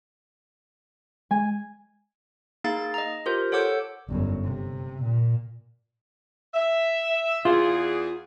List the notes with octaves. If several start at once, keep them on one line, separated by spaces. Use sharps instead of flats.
G#3 G#5
A#3 D#4 G#4 F5 A6
D#5 A#5
F4 G4 A#4 C5
A4 C#5 F#5 D6 E6 G6
G1 F#2
C3
A#2
E5
E2 F4 G#4